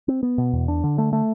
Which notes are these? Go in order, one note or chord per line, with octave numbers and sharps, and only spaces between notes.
C4
B3
B2
E2
D4
D3
A3
A3